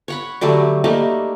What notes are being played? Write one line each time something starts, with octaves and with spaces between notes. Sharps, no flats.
C#5 F#5 B5
D3 F#3 G3 A3
G3 A3 A#3 D#4